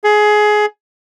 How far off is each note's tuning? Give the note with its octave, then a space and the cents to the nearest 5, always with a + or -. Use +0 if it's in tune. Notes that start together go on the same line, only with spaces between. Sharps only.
G#4 +20